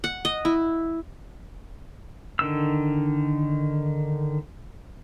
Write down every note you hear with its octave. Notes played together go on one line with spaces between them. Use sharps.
F#5
D#5
E4
D3 D#3 E6